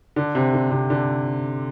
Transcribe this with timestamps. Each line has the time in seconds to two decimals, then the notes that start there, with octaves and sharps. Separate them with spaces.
0.16 D3
0.35 C3
0.53 D3
0.71 C3
0.90 D3